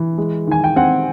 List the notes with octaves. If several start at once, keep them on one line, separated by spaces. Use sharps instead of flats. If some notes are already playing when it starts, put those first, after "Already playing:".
Already playing: E3
G#3
D#3 G#5
G5
C4 F#5